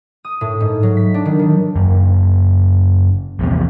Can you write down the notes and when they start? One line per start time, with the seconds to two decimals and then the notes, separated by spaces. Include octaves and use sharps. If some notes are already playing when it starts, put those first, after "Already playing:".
0.25 D#6
0.41 A2
0.60 G#2
0.83 F#3
0.97 B6
1.14 D4
1.25 D#3
1.39 D#3
1.76 F#1
3.39 A#1 E2 C3